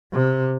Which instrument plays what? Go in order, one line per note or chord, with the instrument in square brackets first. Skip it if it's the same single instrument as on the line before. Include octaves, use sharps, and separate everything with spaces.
[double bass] C3